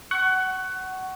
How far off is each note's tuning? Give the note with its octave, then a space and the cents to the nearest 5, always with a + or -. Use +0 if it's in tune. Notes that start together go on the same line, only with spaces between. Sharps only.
F#5 +20 C#6 +0